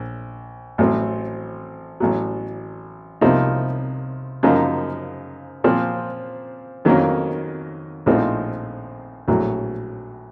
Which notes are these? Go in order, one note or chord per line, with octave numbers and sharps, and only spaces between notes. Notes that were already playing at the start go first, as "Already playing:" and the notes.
Already playing: A#1
A1 A2 F#3 C4
A1 A2 F#3
C2 C3 F3 A#3 D#4
F#2 C#3 F3 A#3 D#4
A#2 F3 C4
F2 D#3 F#3 A#3 C#4
A#1 A2 F3 C4 D#4
A#1 A2 F#3